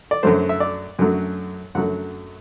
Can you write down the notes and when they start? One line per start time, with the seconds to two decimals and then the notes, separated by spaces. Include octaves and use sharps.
0.11 D5
0.23 F#2 D3 F#3 A3 C5
0.49 E5
0.60 D5
0.99 F#2 D3 F#3 A3
1.75 F#2 D3 F#3 A3 F#5